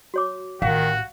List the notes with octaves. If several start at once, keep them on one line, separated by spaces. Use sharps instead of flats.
F#4 C#5 D6
A1 D#3 F#4 F5